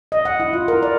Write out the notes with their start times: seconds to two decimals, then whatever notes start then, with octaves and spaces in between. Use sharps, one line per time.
0.12 D#5
0.25 F#5
0.40 E4
0.53 F4
0.68 A#4
0.83 D5